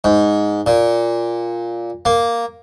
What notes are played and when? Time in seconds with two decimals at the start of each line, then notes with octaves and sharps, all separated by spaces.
0.04 G#2
0.66 A#2
2.05 A#3